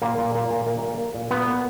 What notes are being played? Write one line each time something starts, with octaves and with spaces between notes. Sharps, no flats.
A#2 A#3
A#2
A#3
A#2
A#3
A#3
A#3
A#2
A#3 B3
A#3